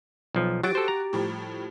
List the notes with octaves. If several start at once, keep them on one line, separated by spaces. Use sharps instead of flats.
B1 F3
F#3 F#4 G4 A6 D7
A4 C5
A#5
A2 F3 G3